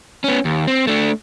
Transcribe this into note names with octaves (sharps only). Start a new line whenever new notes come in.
B3 C#4
D#2
C4
A3 D4